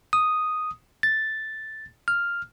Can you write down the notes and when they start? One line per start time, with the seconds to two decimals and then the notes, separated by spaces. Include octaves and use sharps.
0.13 D#6
1.03 A6
2.08 F6